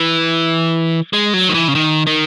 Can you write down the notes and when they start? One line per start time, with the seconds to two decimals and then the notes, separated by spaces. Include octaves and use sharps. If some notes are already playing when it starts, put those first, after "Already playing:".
Already playing: E3
1.13 G#3
1.34 F#3
1.49 D#3
1.54 E3
1.68 C#3
1.75 D#3
2.07 D#3